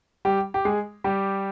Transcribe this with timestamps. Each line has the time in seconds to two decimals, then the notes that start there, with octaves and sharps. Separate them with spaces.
0.25 G3 G4
0.54 G4
0.65 G#3 G#4
1.04 G3 G4